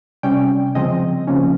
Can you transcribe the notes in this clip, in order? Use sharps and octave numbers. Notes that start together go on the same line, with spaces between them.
C3 G3 C#4 G5
C#3 F3 G#3 C4 D#5
C#3 F3 A#3 C#4